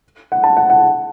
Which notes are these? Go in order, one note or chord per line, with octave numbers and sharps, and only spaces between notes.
F#5
A5
F#5
F#5